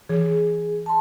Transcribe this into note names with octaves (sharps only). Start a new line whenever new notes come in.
E3 G#4
A5 C6